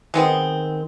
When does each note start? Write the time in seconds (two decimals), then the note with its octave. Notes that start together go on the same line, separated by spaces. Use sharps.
0.14 D#3 G#3 B3 C4